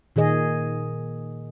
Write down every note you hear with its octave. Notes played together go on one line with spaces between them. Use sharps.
A#2 D#3 G#4 D#5